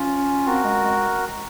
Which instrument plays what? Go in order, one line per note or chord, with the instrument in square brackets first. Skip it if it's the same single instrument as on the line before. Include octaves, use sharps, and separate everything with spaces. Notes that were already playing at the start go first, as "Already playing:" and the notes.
Already playing: [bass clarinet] C#4 [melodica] F4
[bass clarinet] C4 [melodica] F#4 A#4
[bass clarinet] G#3
G#3